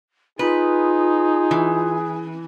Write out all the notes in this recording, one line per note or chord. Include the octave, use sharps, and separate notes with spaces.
D#4 F4 G#4 B4
E3